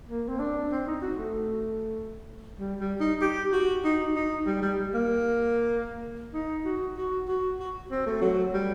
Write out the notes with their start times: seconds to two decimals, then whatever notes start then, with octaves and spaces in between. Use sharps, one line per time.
0.09 A#3
0.29 C4
0.39 D4
0.72 C4
0.87 D#4
1.02 F#4
1.18 A3
2.59 G3
2.80 G3
3.00 D#4
3.21 G4
3.53 F#4
3.84 D#4
4.15 D#4
4.46 G3
4.62 G3
4.94 A#3
6.34 D#4
6.65 F#4
6.97 F#4
7.28 F#4
7.59 F#4
7.90 C4
8.06 A3
8.21 F#3
8.53 G3